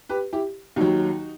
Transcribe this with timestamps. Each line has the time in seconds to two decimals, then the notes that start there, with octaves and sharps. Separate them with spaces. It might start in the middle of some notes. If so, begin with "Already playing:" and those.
0.09 G4 B4
0.33 E4 G4
0.76 D#2 D#3 F#3 D#4 F#4